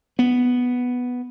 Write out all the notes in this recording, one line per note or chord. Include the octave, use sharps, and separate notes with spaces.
B3